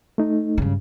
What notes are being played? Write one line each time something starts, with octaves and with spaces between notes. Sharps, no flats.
A3 D#4
G2 C#3